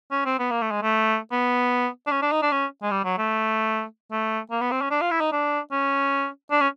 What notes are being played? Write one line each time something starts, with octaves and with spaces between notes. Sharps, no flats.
C#4
C4
B3
A#3
A3
G#3
A3
B3
D4
C#4
D4
D#4
D4
C#4
G#3
G3
F#3
A3
A3
A#3
B3
C4
C#4
D4
F4
E4
D#4
D4
C#4
D4
C#4